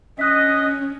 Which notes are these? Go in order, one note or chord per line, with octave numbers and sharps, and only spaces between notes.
C#4 D#5 D#6 F#6 B6